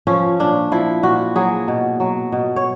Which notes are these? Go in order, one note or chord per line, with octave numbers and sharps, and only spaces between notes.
F3 C#4
A#2 D4
F3 E4
A#2 F#4
F#3 G#4
B2
F#3
B2
C#5